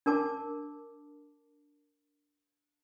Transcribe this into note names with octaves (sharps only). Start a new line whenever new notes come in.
D4 A#4 A5 D6